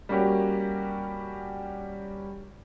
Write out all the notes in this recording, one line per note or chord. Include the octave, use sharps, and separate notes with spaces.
G3 A#3 C#4 F#4 G4